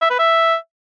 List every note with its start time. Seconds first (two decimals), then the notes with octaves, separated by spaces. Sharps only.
0.02 E5
0.10 B4
0.19 E5